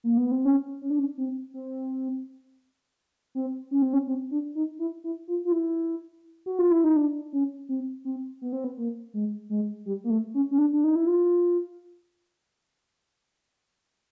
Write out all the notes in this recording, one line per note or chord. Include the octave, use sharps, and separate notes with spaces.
A#3
B3
C4
C#4
C#4
D4
C#4
C4
C4
C4
C#4
C4
C#4
C4
D4
D#4
E4
E4
F4
F4
E4
F#4
F4
E4
D#4
D4
C#4
C4
C4
B3
C4
B3
A#3
G#3
G#3
G3
A#3
A3
C#4
C#4
D4
D4
D#4
E4
F4